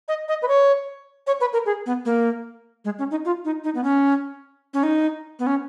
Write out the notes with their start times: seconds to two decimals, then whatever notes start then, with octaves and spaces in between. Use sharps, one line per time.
0.08 D#5
0.28 D#5
0.42 B4
0.48 C#5
1.27 C#5
1.41 B4
1.53 A#4
1.66 G#4
1.86 B3
2.05 A#3
2.85 G#3
2.99 C#4
3.11 D#4
3.25 F4
3.45 D#4
3.64 D#4
3.75 B3
3.84 C#4
4.74 C#4
4.83 D#4
5.39 B3
5.47 C#4